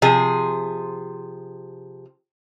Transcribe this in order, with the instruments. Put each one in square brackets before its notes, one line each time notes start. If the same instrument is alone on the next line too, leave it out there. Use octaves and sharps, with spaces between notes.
[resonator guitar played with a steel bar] C3 F3 G#4